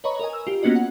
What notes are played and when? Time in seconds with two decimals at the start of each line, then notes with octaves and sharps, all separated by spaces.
0.04 B4 C#5 D#5 A#5 B5 C#6
0.20 A#4 D#5 G#5
0.33 E6
0.47 F4 G4
0.63 A#3 B3 C#4 F#4 D#5
0.75 F#5